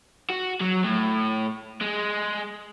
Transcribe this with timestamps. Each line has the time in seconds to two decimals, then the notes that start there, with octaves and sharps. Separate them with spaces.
0.30 F#4
0.61 F#3
0.84 A2
1.81 G#3